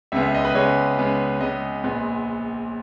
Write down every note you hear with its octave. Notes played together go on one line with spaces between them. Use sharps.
C#2 C#3 G#3 B3 E5
E5
D#5
B4
C#2 C#3 G#3 B3 C#5
C#2 C#3 G#3 B3
C#2 C#3 G#3 B3 D#5
A#1 A#2 G#3 B3